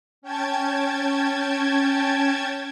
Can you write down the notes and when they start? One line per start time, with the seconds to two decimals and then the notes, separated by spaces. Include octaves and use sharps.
0.22 C#4 G5 A5 G#6